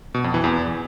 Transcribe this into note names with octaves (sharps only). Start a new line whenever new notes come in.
B2
F2
E3
E2